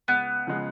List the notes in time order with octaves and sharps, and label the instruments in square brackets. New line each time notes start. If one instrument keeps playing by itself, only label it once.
[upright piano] C#2 [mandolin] B3
[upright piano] C#3 F3 G#3